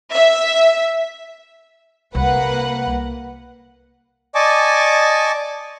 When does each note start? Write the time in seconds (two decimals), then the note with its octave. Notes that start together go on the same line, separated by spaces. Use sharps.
0.14 E5
2.15 C2 A#3 B4 F#5
4.35 D5 D#5 G#5 A5 C#6 D6